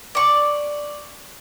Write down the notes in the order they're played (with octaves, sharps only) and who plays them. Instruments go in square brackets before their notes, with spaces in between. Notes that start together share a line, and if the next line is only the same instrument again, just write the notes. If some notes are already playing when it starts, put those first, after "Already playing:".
[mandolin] D5 C#6